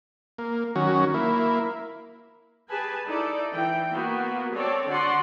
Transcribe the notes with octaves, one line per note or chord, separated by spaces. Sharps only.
A#3
D#3 F#3 C#4 F#4
A#3 E4
G4 G#4 B4 G#5 A5
D#4 E4 A4 D5
E3 G5
A#3 B3 F#4
C4 A4 C#5 D5
D3 F#4 D5 F#5 C6